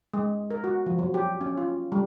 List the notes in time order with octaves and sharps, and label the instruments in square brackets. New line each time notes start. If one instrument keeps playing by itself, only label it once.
[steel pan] G#3
A#4
F#4
F3
F#3
G4
C#4
F4
G3